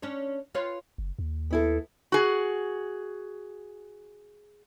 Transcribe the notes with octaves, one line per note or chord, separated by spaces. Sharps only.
C#4 D4 C#5
F4 B4 C#5
F#1
D#2
B3 E4 A4
F#4 G#4